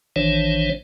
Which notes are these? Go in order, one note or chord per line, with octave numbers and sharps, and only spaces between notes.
A1 D#3 E3 D4 C5 C#5